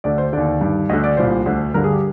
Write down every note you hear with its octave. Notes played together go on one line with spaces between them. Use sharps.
D2 D3 D5
C5
D#2 D3 D5
G2 D#3
D2 D3 D#5
D5
C2 A#2 C5
D2 D3
G2 D3 A#4
G#4
G4